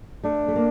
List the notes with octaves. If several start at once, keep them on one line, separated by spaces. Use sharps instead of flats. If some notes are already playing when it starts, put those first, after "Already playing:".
A3 D4
A3
A#3